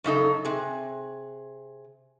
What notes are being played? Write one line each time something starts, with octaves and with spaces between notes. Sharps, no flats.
F#2 C#3 D#4 A4
C3 G#4